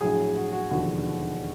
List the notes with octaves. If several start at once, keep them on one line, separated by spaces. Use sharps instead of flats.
A#1 A2 F#3 G#4
F#4
F#4
E1 D#2 D3 F3 F#4